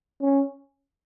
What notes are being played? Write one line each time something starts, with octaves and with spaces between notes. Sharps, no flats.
C#4